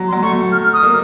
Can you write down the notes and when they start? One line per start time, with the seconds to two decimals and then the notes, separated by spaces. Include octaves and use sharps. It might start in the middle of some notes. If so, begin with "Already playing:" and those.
Already playing: F#3
0.08 C6
0.12 F#3
0.22 A3 C#6
0.52 F6
0.63 F6
0.73 D#6
0.83 A#3